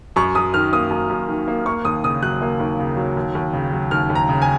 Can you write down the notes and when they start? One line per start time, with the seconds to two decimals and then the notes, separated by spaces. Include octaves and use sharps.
0.16 F#2 C#6
0.35 F#2 D#6
0.54 D#3 F6
0.73 A#3 D#6
0.90 F#2
1.09 F#2
1.29 D#3
1.48 A#3
1.66 A#3 C#6
1.85 D#2 D#6
2.04 C#3 D#6
2.22 F#3 F#6
2.42 A#3
2.60 D#2
2.79 C#3
2.97 F#3
3.17 D#2
3.35 D#2
3.53 C#3
3.72 F#3
3.91 D#2 F6
4.10 D#2
4.15 A#5
4.29 C#3
4.42 G#5